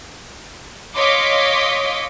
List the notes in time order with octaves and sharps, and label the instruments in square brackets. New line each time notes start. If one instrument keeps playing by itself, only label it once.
[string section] C#5 D#5 F5 C6 D6 B6